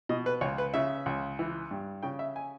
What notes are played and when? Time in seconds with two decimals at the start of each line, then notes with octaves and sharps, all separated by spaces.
0.09 B2 D#5
0.26 B4
0.41 C#2 C#5
0.58 B4
0.74 C#3 E5
1.06 C#2
1.39 E3
1.71 G2
2.03 C#3 G5
2.19 E5
2.36 G#5